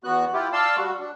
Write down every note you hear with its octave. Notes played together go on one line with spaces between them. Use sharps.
E2 B3 F#4 F#6
E4 F4 G4
D5 F5 A5 C6 E6
G3 F#4
D4